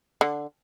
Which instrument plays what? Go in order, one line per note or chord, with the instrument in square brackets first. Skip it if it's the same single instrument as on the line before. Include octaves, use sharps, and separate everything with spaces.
[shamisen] D3